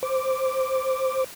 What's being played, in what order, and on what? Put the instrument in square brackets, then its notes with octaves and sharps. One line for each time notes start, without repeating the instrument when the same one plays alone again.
[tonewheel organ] C5 D6